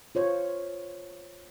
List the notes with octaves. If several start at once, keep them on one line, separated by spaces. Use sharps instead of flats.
F4 C5 C#5